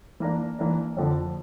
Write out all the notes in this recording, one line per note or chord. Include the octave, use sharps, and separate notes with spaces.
E3 A#3 D4
E3 A#3 D4
F2 D3 F3